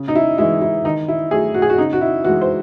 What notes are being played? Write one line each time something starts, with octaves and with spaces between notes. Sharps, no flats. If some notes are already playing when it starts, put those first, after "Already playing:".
Already playing: C#3
D#4
E4
E3 G#3 E4
E4
D#3 D#4
E4
F#3 A3 G#4
F#4
G#4
F#4
C#3 D#4
F#4
E4
E3 G#3 F#4
C5